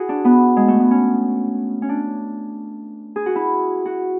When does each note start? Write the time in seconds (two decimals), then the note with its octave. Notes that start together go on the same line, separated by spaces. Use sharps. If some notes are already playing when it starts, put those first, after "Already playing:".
Already playing: E4 F#4 G#4
0.09 D4
0.25 B3
0.57 G#3
0.68 A3
0.80 B3
0.91 C#4
1.82 C#4
1.89 D4
3.16 G#4
3.26 F#4
3.36 E4
3.86 F#4